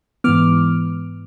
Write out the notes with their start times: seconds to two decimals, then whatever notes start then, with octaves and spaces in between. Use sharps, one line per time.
0.24 G#2 E3 B3 D6 F6